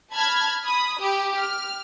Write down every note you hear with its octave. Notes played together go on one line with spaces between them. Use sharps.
A5 B5 F6 G#6
B5 D#6
G4
F6